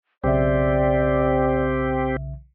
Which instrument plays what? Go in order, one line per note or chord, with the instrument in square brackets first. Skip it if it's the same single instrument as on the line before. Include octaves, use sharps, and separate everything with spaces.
[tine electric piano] B1 C#3 E5 [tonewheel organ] C4 G4 [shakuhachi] D5